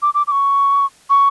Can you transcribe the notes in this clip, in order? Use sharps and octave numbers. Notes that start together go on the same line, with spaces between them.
D6
D6
D6
C#6
C#6